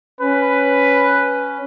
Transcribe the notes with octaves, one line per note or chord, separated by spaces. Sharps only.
C#4 B4